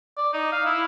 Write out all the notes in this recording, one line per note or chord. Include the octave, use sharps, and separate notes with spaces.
D5
D#4
F5
E4